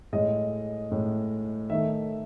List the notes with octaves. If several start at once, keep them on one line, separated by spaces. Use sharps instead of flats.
A2 G#3 D#5
A2 G#3
D#3 A3 E5